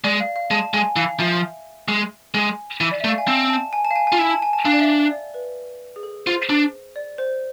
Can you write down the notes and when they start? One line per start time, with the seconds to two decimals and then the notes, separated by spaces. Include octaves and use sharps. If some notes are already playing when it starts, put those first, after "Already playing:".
0.04 G#3 D5
0.20 F5
0.36 F5
0.51 G#3 A5
0.73 G#3 G#5
0.96 E3 F5
1.20 F3 E5
1.88 G#3
2.34 G#3 G#5
2.81 E3
2.91 D5
3.00 E5
3.04 A3
3.09 F5
3.18 G#5
3.27 C4 A5
3.50 A5
3.73 G#5
3.85 A5
3.91 F5
3.96 G#5
4.07 G#5
4.12 F4
4.19 E4 G#5
4.30 A5
4.42 G#5
4.53 A5
4.65 D4 F5
4.73 D5
4.80 E5
4.96 E5
5.11 D5
5.34 B4
5.96 G#4
6.03 A4
6.26 F4 C5
6.49 D4
6.96 D5
7.18 C5